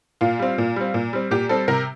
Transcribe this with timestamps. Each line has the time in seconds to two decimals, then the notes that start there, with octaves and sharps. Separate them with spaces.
0.21 A#2 F4
0.39 G3 C4
0.58 A#2
0.76 G3 C4
0.94 A#2
1.13 G3 C4
1.31 A#2 G4
1.49 G3 C4 A4
1.68 C3 A#4